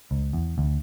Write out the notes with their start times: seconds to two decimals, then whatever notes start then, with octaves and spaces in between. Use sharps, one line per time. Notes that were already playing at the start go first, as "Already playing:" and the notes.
0.11 C#2
0.33 E2
0.58 D2